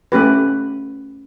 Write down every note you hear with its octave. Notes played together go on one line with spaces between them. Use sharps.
A3 C#4 G4 B4